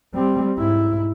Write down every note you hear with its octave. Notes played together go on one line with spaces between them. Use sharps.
G3 C4
G#2 E4